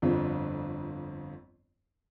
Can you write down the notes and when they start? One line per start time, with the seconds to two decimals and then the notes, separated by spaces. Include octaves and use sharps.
0.02 G1 F2 D3 C4